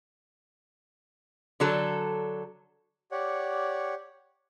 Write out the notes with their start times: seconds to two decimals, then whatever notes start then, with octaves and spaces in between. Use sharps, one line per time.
1.60 D3 F#3 A4
3.12 G4 C#5 D5 F#5